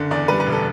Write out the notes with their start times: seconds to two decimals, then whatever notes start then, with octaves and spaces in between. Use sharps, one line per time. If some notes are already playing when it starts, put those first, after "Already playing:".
Already playing: F#1 D3
0.11 E2 D5
0.28 G3 B4
0.40 B4
0.46 E1
0.52 A4